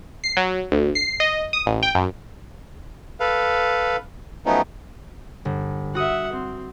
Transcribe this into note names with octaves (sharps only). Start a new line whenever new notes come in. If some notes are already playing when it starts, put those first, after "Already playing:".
C7
F#3
D2
C7
D#5
D#6
A1
G5
F#2
A4 B4 F5
F3 F#3 A3 B3 C#4 D#4
G1
F#4 E5 F#5 D#6 D#7
C4